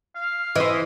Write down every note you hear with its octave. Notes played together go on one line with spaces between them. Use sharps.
F5
E3 C5 D#5